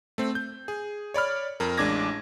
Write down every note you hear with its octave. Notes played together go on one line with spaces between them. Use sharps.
A3 C4
G6
G#4
C#5 D5 B5 F6
F2 A#4
A1 G#3 D4 D6 G#6 A#6